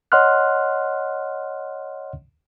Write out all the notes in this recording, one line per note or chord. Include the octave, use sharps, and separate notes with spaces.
C#5 D#5 F#5 C6 F6 F#6